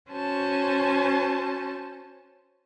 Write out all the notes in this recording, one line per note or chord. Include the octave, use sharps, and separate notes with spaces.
C#4 F#4 C5 A5